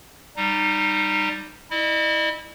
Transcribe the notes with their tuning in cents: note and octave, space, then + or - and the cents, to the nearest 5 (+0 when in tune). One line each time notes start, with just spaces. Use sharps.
G3 +0 D#4 -20
E4 -25 D#5 -45